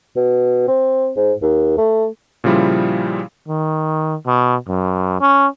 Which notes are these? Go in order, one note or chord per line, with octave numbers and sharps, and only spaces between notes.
B2
C4
G#2
D#2
A3
A#2 C#3 F3 G3 E4 F4
D#3
B2
F#2
C#4